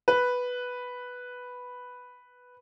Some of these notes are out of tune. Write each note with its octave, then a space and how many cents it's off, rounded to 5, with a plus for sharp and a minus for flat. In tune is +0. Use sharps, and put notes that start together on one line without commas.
B4 +0